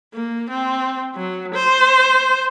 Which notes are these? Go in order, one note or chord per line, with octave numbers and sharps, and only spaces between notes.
A#3
C4
F#3
C5